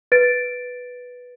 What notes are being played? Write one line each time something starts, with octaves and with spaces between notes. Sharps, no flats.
B4 A6 D7